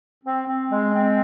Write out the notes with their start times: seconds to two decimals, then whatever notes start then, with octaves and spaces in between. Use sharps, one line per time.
0.24 C4
0.46 C4
0.70 G#3
0.93 C4